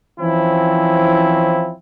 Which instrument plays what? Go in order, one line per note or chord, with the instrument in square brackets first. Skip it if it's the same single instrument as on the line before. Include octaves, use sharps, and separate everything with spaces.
[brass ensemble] E3 F3 C4 C#4 E4